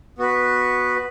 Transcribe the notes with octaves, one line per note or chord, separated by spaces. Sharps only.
B3 F#4 B4